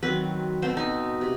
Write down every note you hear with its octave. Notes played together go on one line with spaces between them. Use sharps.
D#3 F#3 C4 B4
B2 A3 C4 C5
D#4
C3